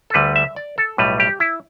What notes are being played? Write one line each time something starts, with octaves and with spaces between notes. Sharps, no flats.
A4
D2 D3 G3 B4
E5
D5
A4
B1 A2 G3 B4
G4
E4